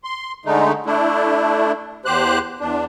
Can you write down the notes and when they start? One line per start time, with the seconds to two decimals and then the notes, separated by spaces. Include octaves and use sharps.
0.04 C6
0.45 D3 G#3 A3 D#4
0.86 A3 D4 E4
2.05 E2 G4 C5 F#6
2.60 E2 D4